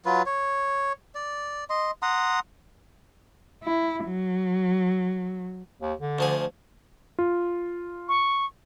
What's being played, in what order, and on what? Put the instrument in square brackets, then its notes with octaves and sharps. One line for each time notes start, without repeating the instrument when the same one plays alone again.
[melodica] F#3 F4 B4
C#5
D5
D#5 C6
F#5 A#5 C6 D#6
[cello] E4
F#3
[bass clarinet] D#2
D3
[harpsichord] D2 F3 G#4
[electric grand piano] F4
[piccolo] C#6